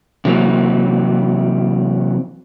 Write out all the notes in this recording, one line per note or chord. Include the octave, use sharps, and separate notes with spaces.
C3 E3 F#3 A#3 C4